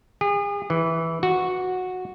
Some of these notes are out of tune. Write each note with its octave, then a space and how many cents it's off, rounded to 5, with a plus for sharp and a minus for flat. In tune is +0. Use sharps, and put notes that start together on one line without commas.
G#4 -40
E3 -5
F#4 -10